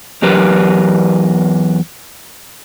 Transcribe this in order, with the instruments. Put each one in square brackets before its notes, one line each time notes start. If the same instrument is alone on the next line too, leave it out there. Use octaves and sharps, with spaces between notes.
[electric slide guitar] E2 F#3 G4 A#4 B4